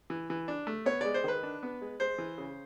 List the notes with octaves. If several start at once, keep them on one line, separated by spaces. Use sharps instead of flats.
E3
E3
D4
A3
B3 C#5
G#3 D5
C5
D#3 B4
D4
B3
G#3
G#3 C5
E3
C#3